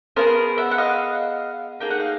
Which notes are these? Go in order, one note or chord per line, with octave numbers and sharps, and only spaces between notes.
B3 E4 G#4 A#4 C5
E5 F#5
F#5
D#5 F5
A#3 D#4 G#4 G5
F#5
F5